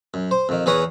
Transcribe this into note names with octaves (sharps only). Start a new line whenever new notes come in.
F#2
C5
F2 D#3
E2 G#4 B4 C#5 A#5